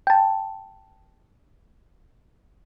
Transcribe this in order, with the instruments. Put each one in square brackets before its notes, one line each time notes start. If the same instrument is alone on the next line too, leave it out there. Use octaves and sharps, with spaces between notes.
[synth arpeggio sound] G5 A5